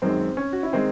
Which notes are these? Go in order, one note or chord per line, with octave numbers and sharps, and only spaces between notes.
F#2 D#3 G#3 C4
C#4
F#4
E4
D#3 G#3 C4 D#4